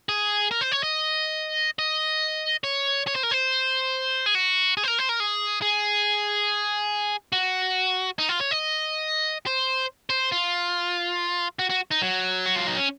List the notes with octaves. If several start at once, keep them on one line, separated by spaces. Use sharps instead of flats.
G#4
A#4
C5
C#5
D#5
D#5
C#5
C#5
C5
A#4
C5
G#4
F#4
G#4
C5
A#4
C5
A#4
G#4
G#4
F#4
D#4
F4
C#5
D#5
C5
C5
F4
F#4
F#4
D#4
F#3
F#4
F4
D#4
C#4